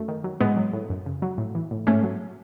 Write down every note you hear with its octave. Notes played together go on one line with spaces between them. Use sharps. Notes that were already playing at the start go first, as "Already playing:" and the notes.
Already playing: F#2 A3
D#3
F#3
A2 G#3 B3
F#3
A2
F#2
C#3
F#3
A2
E3
A2
G#2 A3 C#4
F#3